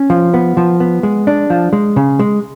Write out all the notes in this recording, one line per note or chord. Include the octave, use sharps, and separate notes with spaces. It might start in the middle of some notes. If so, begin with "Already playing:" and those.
Already playing: C#4
F3
B3
F3
B3
G#3
D4
F3
G#3
C#3
G#3